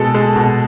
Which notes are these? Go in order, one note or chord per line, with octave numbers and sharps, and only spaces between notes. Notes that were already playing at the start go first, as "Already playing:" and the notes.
Already playing: B2 G#3 A4
G#3
B2